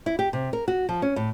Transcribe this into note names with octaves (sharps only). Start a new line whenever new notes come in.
E4
G4
C3
A#4
F#4
F3
C#4
A2